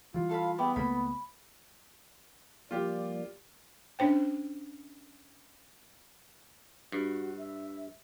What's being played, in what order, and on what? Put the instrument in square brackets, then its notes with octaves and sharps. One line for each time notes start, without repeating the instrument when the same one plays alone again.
[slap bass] E3 G3 [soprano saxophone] F4
[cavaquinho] A4 F5 B5
[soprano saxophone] B3 [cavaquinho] E4 G4 G#4
[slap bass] C#2 A3 A#3 [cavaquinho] B5
[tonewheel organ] F3 G3 A#3 [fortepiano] F4 G4 [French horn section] D5
[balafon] C#4 D4 C5 G5
[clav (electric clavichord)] G2 [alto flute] F#4
[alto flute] E5